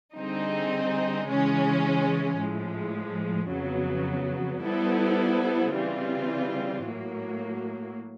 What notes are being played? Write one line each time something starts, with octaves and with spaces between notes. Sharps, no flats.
D3 G3 C4 D#4 G#4
C#3 E3 G#3 C#4
A2 F3 G#3
F2 C#3 F#3 B3
G3 B3 E4 A4 C5
C#3 E3 G3 C4 F4
A2 F#3 A#3